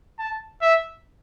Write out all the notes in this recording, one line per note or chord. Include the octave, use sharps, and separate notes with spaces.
A5
E5